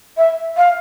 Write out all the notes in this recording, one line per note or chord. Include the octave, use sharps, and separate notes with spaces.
E5
F5